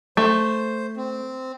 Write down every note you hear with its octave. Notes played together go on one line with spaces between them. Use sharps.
A3 C5
C4